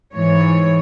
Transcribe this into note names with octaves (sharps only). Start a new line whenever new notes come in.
G#2 E3 C#5